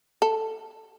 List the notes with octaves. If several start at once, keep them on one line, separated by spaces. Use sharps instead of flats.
A4